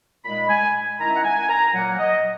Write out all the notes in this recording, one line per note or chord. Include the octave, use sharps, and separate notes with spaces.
A#2 G#3 D#4 B5
G#5
D#3 G#3 C#4 E4 A#5
E5
F#5
G#5
A#5
A#2 F#3 A#3 F#5
D#5